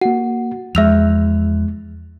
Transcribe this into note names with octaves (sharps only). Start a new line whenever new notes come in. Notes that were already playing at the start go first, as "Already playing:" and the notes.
A#3 F#4 F#5
E2 F3 G#3 E5 E6 F7